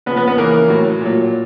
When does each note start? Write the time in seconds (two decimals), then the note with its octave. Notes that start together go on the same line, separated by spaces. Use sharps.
0.06 C#3 F3 B3 B4
0.16 B3 B4
0.28 B3 B4
0.37 C#3 E3 A#3 A#4
0.69 A2 F#3
1.01 A#2 F#3